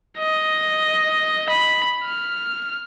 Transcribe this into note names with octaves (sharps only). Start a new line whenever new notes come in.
D#5
B5
F6